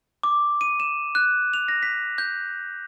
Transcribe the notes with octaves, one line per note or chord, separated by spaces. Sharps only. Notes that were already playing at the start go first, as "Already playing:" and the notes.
D6
D#7
E7
F#6
F7
A#6
B6
G6